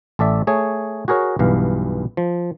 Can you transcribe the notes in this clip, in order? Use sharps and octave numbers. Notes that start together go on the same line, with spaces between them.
A1 A4 D5 E5
A3 G#4 C#5
F#4 G#4 A#4 C#5
B1 G2 E3 F5
F3